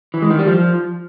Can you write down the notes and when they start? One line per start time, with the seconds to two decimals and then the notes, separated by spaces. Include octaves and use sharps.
0.14 E3
0.22 G#3
0.30 D#3
0.39 G3
0.47 F3